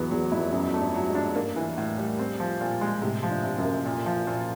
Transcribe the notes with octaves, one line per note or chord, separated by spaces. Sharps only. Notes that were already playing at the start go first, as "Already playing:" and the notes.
Already playing: E2 F#3 B3
E2 F#3
F2 E4
F#2 F#3
A3
G2
F#3
G#2
D4
G2 A#3
E3
A2
G3
C4
F3
A#2
G#3
A2 C3
F3
G2
C3
F#2
A#3
A#2
F3
A#2